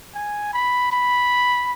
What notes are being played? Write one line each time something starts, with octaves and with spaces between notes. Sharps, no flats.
G#5
B5
B5